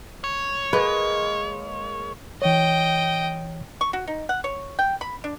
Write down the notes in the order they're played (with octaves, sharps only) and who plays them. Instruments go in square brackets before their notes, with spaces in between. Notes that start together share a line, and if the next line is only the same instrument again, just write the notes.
[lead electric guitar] C#5
[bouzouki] G#3 A#3 [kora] B4
[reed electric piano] E3 C#5 [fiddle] D#5 G5
[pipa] C#6
F#4
D#4
F#5
C#5
G5
B5
D4